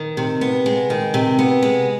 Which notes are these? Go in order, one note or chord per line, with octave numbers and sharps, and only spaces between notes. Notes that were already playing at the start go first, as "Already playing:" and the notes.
Already playing: D#3
C3
B3
G#3
D#3
C3
B3
G#3